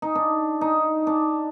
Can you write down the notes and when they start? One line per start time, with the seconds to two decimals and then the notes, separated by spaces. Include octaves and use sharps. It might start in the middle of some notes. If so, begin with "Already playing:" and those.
0.02 D#4
0.15 D4
0.61 D#4
1.07 D4